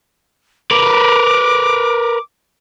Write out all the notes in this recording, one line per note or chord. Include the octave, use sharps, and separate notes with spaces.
A#4 B4 D6